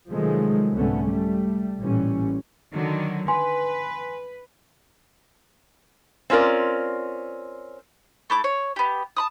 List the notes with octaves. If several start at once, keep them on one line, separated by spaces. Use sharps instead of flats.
C3 D#3 F3 F#3 G#3 A3
C2 G#2 D3 A3 B3 C#4
G3 A3
A1 A#2 E3 G3 C#4
D3 D#3 F#3
B4 G#5 C6
C4 C#4 F4 A#4 D5
A3 E4 D6
C#5
B3 G4
A5 B5 D#6